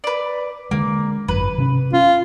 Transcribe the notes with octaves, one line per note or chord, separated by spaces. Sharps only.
B4 D5
D3 G#3 A#3
G#1 F#2 B4
C3 C#4
C#4 F4